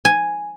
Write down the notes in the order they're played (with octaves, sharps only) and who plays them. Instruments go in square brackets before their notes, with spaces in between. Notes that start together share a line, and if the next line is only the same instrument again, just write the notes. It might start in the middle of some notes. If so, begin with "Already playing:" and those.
[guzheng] G#5